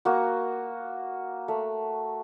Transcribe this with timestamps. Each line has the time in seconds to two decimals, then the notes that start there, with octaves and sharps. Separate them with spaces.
0.05 A#3 F#4
1.48 A3